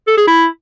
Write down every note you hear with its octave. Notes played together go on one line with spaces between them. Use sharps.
A4
G#4
E4